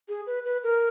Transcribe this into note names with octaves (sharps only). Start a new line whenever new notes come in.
G#4
B4
B4
A#4